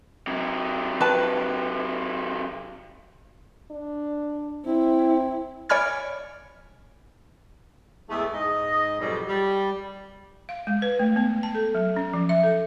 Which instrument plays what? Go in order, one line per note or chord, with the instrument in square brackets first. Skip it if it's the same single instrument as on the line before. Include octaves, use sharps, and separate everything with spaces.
[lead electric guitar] C3 F#3
[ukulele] B4 A5
[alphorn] D4
[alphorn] C4 [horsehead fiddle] E4
[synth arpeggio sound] C#5 D5 G#5 B5 F6 G#6
[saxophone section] E2 G#3 A3
G#2 D#5
F2 G#2 B2 F#3 G3
G3
[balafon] F5
G#3
B4
A3
B3
A5
A4
F#3
C#4
F3
E5
A4